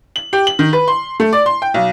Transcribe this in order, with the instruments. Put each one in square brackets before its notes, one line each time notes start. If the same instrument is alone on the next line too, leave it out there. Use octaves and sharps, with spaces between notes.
[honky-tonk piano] F#7
G4
F#7
D#3
B4
C6
A3
D5
C6
G5
B1